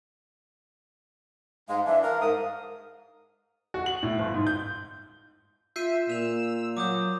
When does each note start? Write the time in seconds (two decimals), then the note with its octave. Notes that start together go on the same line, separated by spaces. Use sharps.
1.69 G#2 G#3 F5
1.86 E3 D4 E5
2.03 A#4 F5
2.21 G#2 A#4 D#6
3.74 F#4
3.86 F#7
4.03 A2
4.19 G1
4.34 G#2
4.47 G6
5.76 F4 E5 G6 C7 D#7
6.10 A#2 E6 E7 F7
6.77 F#3 D6 D#6 G6